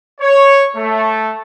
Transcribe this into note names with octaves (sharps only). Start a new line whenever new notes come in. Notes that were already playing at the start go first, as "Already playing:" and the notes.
C#5
A3